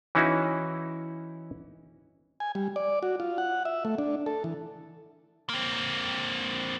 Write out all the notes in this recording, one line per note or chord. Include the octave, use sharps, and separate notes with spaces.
E3 C#4 D#4 E4 F#4
G#5
G3
D5
F#4
F4
F#5
E5
A3
D4
A4
E3
A#3 C4